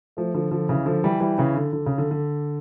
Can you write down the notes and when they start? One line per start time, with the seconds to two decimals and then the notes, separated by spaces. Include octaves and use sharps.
0.17 F3 A3
0.34 D3 F3
0.51 D3 F3
0.69 C#3 E3
0.86 D3 F3
1.04 E3 G3
1.20 E3 G3
1.38 C#3 E3
1.56 D3
1.73 D3
1.86 C#3
1.98 D3
2.11 D3